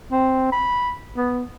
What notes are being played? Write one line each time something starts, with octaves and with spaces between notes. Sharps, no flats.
C4
B5
B3